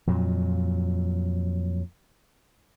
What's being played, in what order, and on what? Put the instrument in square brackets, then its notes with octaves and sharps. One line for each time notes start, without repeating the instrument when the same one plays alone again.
[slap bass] F2 A#2 F#3